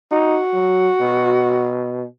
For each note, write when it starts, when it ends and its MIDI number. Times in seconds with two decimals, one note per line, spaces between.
0.12 0.39 63
0.12 1.70 66
0.53 0.89 54
1.01 2.06 47